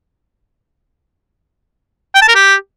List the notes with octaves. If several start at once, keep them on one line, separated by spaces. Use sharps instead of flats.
G5
A5
A#4
G4